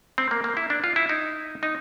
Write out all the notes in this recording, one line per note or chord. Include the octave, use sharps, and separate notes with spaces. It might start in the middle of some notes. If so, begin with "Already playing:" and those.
C4
A#3
A#3
E4
D4
F4
E4
D#4
D#4